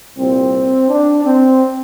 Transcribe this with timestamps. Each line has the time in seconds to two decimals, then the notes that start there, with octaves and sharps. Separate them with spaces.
0.17 C2 A#2 G3 C4
0.88 D4
1.24 C4